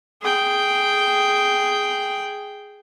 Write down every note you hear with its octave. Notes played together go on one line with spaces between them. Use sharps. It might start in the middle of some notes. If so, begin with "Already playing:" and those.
G#4 G5